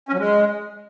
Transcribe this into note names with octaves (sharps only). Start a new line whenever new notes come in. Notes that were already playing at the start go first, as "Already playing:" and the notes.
C#4
F#3
G#3